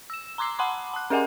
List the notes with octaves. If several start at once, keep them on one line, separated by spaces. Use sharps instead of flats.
E6 E7
A#5 C6 D6 E6 C7
F#5 A5 B5 C6 D6
A5 F#6
C#4 G#4 A#4 D#5 F#5 G#5